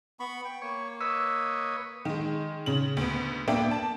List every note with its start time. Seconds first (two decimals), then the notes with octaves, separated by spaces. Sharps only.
0.20 B3 B5 C#6
0.45 G5
0.62 A#3 C#5
1.01 B4 C#5 D#5 E6
2.05 D#3 G#3
2.66 C#3 F#7
2.97 D2 B3
3.48 A#3 B3 D4 E5 G5
3.71 A5